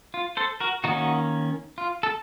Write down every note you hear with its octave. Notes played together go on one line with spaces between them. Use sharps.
F4
A4 C5
F#4 A#4
D#3 A#3 C#4 D#4 F#4
F4
A4